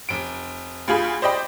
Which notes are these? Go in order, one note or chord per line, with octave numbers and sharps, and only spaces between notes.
F1 D7
D2 F4 G#4 B5
C5 D5 D#5 G5 B5